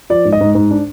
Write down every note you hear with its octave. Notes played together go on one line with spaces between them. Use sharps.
F3 D5
G#2
D#5
G#2
G#2
D4